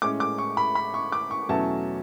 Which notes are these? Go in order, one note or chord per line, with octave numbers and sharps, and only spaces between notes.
A2 G#3 C#4 D6
D6
C#6
B5
B5
C#6
D6
C#6
E2 B2 F#3 A3 C#4 A5